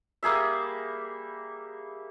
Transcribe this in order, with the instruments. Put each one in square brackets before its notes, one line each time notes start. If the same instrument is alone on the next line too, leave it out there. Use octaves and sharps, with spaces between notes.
[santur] G3 A#3 G#4 E5